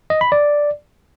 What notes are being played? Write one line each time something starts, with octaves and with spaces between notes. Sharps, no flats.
D#5
B5
D5